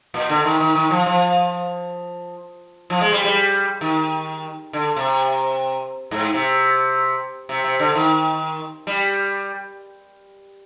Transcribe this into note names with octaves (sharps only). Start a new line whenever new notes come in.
A#2
D3
D#3
D#3
D#3
F3
F3
F3
G#3
G3
G3
D#3
D3
C3
G#2
C3
C3
C3
D3
D#3
G3